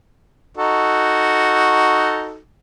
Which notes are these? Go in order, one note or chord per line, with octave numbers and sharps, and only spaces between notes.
D#4 F#4 A4